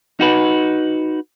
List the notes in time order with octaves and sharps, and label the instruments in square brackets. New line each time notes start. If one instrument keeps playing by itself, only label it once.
[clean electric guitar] D#4 F#4 B4